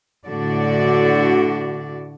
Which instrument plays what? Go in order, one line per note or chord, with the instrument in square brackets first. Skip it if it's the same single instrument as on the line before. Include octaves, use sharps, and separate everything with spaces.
[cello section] A2 D3 F#4 D5